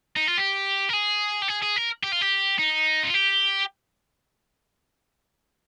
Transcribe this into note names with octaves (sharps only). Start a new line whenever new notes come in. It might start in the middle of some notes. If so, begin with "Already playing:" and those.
D#4
F4
G4
A#4
G#4
G4
G#4
G#4
A#4
G4
F4
G4
D#4
F4
G4